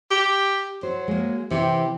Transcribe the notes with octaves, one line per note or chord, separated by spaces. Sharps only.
G4
F#3 C5
G#3 A#3
C3 E3 C4 G4